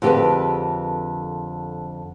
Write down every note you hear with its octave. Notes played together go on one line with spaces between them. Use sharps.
F2 D3 G4 G#4 A#4 B4